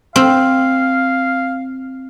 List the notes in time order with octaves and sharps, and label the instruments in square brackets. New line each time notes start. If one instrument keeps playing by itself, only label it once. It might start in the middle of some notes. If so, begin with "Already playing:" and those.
[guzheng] C4 [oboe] F5